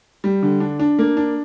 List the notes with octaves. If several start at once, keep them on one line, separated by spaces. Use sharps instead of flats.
G3
D3
D4
D4
A#3
D4